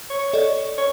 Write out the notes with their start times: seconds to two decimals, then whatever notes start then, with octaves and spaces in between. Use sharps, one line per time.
0.10 C#5
0.33 A4 D5 D#5
0.78 C#5